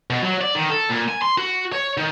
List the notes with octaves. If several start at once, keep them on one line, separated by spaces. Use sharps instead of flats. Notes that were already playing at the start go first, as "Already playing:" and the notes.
B2
F#3
D5
D#3
A4
A#2
G#5
C6
F#4
C#5
D#3